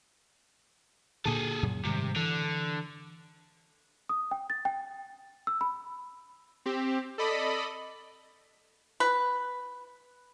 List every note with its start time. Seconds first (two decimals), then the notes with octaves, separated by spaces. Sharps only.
1.25 A#2 D3 G#4 A4
1.63 F#2 A#2 C#3
1.85 G#2 C3 D#3 G3
2.16 D3 E3
4.09 D#6
4.31 G5
4.50 A6
4.65 G5
5.47 E6
5.61 B5
6.66 C4 G4
7.18 A4 D5 D#5 B5
9.00 B4